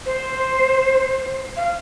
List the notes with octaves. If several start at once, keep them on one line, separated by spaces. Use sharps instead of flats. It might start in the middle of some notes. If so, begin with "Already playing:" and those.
C5
F5